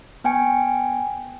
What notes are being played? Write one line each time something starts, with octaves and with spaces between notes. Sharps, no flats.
B3 G5 G#5 C#7